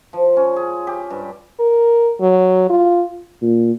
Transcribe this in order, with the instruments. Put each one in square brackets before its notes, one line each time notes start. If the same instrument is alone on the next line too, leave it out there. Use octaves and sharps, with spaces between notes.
[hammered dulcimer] F3
C#4
G#4
G4
G2
[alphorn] A#4
F#3
F4
[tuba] A#2